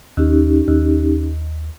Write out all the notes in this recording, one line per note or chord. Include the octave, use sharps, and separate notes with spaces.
D#2 C#4 D#4 G4
D#2